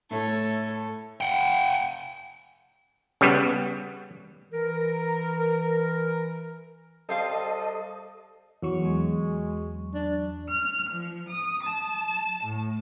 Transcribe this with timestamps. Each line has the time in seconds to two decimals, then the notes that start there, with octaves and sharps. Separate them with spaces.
0.11 A2 A3 A4 C#5
1.21 F#5 G5
3.21 C#3 G3 B3
4.51 E3 A#4
7.09 G3 A4 C5 D#5 F5
8.63 E2 F#3 C#6
8.81 G#3
9.95 D4
10.49 F6
10.89 F3
11.28 D#6
11.63 A5
12.44 A2